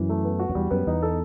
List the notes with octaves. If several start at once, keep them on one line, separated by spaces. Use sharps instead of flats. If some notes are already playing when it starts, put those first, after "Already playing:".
Already playing: F#2 E3
A3
B3
F#4
F#2
E2 G3
F#2 B3
E2 D#4
A4